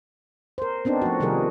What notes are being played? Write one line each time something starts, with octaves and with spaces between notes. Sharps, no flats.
A#4 C5
B3 C4 D4 D#4
F3 A3 F#4
C3 D#3 F3 G3 G#4 A#4